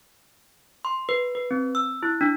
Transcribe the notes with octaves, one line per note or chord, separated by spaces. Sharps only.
C6
B4
B4
C4
E6
E4
D4